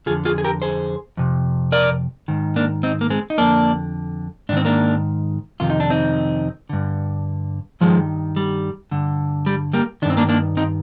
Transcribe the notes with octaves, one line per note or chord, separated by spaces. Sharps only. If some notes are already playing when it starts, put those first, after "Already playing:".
F2 D3 F4 G#4
F4 G#4
G#4
G4 A#4
G#4 C5
F2 C3
A#4 D5
G#2 D#3
A#3 D4
C4 D#4
A#3
G#3 C4
D#4
F2 D3 A#3 D4
G#2 D#3 C4 D4
A#3 D4
F2 C3 D#3 F4
D#4
D4
C4 D#4
G2 D3
G2 D#3 F3 G#3
G3
G2 D3
G3
G3 A#3
G2 D#3 C4 D4
A#3 D4
A#3 D4
C4 D#4